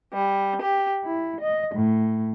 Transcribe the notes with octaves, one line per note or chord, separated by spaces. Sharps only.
G3
G4
E4
D#5
A2